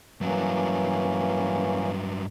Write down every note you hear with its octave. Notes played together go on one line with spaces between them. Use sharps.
G2 E3 F#3 A#3 C#4